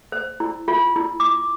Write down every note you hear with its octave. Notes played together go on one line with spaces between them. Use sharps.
C5
E4
F4
E4
D6